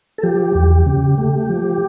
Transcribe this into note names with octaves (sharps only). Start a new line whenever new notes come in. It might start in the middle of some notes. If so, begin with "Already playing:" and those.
A4
F3 G4
E2
C#3
A3
F3